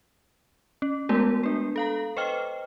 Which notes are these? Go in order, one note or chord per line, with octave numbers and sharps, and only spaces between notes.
C#4
G#3 A3 B3 F#4 A#4 D5
D4 B4
A4 F5 A#5
B4 C5 D#5 G5 F6